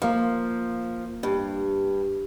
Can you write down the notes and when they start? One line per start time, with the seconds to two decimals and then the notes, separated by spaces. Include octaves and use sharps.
0.02 F3 A#3 F4
1.23 G2